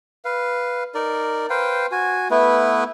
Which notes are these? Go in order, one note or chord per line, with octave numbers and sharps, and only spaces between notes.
B4 F5
D#4 A#4 D5
B4 C5 F5 G5
F#4 G#5
A3 B3 E4 B4